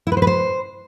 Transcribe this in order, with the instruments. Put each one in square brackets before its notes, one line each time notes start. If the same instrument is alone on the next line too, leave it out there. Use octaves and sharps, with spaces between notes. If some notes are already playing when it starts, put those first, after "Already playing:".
[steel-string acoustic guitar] E4
B4
C5
B4
C5